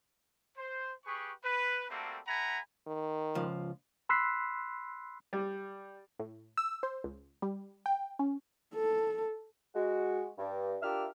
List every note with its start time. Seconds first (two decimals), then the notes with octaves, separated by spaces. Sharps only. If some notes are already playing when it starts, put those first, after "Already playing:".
0.58 C5
1.05 G4 G#4 B4 C#6
1.44 B4
1.90 G3 A3 A#3 C4 F#4 A4
2.27 A3 F#5 G#5 A#5 B5
2.87 D#3
3.35 C#2 F3
4.09 B5 C6 E6 F#6 B6 C7
5.33 G3
6.19 A2
6.57 E6
6.83 C5
7.04 C#2
7.42 G3
7.86 G5
8.19 C#4
8.75 A4
9.75 G#3 F#4
10.38 G2
10.82 D4 F4 G4 A#4 E5 F6